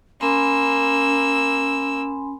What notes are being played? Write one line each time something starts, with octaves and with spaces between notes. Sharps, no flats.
A#3 C#4 G#5 B5 C6 E6